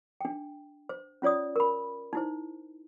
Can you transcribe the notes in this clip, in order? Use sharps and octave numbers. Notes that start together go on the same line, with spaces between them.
D4 G5
C5
C#4 F4 C#5 D5 D#6
A#4 B5
D#4 E4 C5